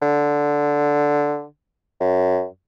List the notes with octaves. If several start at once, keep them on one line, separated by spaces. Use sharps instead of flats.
D3
F#2